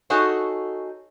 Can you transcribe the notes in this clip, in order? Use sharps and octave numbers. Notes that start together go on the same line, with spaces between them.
D#4 F#4 G#4 A4 C#5